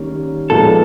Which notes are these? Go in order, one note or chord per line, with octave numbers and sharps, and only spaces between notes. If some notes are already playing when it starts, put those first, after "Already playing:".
Already playing: D#3 G3 A#3 C#4
A#2 F3 G#3 B3 D#4 A4